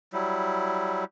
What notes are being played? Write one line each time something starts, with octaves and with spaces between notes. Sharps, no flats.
F#3 G3 E4